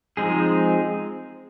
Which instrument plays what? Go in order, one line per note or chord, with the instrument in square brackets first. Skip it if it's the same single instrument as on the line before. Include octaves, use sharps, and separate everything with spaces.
[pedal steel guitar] F3 G#3 C4 D#4 G#4